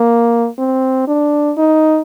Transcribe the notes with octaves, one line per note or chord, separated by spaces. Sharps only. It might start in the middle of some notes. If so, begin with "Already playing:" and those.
Already playing: A#3
C4
D4
D#4